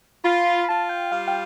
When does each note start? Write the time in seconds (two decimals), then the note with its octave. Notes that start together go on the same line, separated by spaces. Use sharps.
0.24 F4 B5
0.46 B5
0.64 B5
0.69 F4 A5
0.89 G5
1.12 G3 F5
1.28 G5